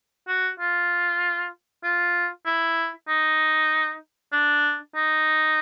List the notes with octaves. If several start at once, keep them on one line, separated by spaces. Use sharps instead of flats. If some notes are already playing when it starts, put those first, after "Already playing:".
F#4
F4
F4
E4
D#4
D4
D#4